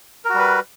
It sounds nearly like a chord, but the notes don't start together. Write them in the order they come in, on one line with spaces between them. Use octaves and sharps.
A#4 F#4 G3 B4